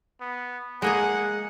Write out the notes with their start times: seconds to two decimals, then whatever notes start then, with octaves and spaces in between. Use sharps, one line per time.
0.21 B3
0.82 G#3 A#3 G#4 F#5